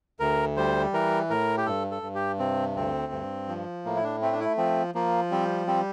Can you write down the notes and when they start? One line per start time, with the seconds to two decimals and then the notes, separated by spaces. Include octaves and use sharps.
0.20 D2 A#4
0.57 G3 C5
0.93 E3 A#4
1.30 A2 A#4
1.57 G4
1.66 G2 A4
1.91 A4
2.02 G2
2.15 G4
2.39 C3 C4
2.76 D2 C4
3.12 G2
3.48 F3
3.85 A2 A#3
3.96 E4
4.04 D4
4.22 A3 C4
4.33 D4
4.40 E4
4.58 F3 C4
4.95 F3 A#3
5.31 G3 C4
5.67 G3 C4